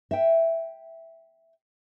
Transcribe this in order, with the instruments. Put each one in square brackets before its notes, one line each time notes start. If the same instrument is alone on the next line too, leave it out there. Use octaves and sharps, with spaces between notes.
[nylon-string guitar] E5 G5